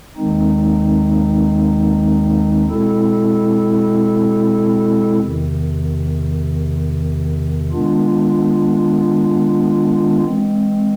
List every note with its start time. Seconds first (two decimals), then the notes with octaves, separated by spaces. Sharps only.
0.17 D#2 D#3 G#3 C4 D#4
2.68 B2 G#3 C4 E4 A4
5.20 E2 C3 D#3
7.72 D#3 G#3 B3 D4 F4
10.24 E3 G#3 C4